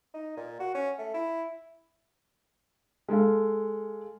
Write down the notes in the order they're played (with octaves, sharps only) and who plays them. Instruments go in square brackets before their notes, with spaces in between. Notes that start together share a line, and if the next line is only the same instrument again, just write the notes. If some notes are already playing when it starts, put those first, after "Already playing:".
[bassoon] D#4
A#2
F#4
C#4
A3
E4
[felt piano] G#3 A4 F5